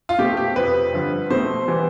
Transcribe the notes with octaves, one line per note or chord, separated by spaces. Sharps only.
F4
B2 A3 C4 G4
G4
F2 C3 F3 C4 B4
G2 D3 F3 C4
B2 A3 C4 C5
E3 G3 B3